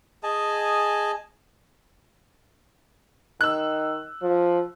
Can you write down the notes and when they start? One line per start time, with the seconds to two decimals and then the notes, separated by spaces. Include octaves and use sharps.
0.23 G#4 D#5 G#5 A5
3.41 D#3 E6 F#6
4.22 F3